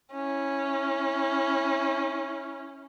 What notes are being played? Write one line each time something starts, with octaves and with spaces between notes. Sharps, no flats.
C#4 E4